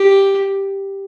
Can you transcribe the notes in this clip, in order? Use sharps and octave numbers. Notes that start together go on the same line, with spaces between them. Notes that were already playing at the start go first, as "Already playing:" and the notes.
Already playing: G4